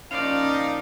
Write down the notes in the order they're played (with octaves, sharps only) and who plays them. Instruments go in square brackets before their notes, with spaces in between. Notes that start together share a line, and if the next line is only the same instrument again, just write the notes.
[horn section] A#2 F3 D#4 [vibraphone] C#4 [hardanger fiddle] D5 [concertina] F5